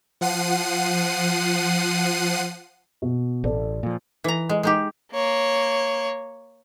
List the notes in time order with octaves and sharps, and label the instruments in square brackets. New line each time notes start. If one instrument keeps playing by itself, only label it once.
[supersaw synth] F3 F#5 C7 D#7
[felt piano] B2
[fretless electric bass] A1 [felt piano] A4 D5
[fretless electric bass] A#2 F3
[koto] E3 A#5
G#3
G#3 D#4 G4
[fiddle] A#3 C#5